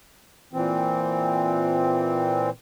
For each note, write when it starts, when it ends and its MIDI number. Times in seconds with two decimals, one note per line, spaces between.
0.53 2.50 46
0.53 2.50 52
0.53 2.50 60